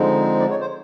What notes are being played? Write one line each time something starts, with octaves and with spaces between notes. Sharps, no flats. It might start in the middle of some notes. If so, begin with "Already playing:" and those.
Already playing: D3 F3 G#3 C4 D#4
D5
C#5
C5